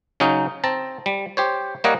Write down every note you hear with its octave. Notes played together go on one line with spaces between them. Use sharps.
C#3 F#3 C#4 D#4
C4 A5 A#5
G3
G4 C5 C#5
G3 A#3 A#4 C#5 D#5 F#5